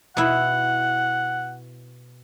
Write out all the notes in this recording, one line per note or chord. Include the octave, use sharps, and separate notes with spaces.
B2 E4 F#5